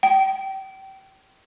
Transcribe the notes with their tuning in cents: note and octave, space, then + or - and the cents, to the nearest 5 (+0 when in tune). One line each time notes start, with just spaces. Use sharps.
G5 -25